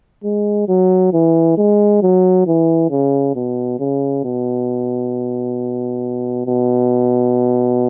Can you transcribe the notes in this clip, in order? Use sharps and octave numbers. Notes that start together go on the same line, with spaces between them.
G#3
F#3
E3
G#3
F#3
E3
C#3
B2
C#3
B2
B2